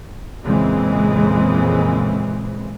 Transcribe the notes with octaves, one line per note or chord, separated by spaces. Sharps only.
F2 A#2 C#3 E3 G#3 C4